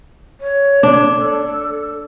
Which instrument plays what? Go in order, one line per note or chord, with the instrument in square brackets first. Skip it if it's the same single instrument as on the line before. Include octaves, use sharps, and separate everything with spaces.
[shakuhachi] C#5
[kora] D4
[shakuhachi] A4